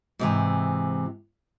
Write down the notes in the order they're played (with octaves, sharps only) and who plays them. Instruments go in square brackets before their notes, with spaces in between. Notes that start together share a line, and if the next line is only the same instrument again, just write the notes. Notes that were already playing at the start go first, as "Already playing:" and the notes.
[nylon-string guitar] G#2 C3 E3